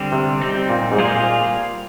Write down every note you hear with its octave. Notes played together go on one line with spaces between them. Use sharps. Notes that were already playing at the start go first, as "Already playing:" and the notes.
Already playing: D3 G3 C4
C3
G3 C4 D#4
A#2
G#2
A#2 G3 A#3 F4 G#4 C5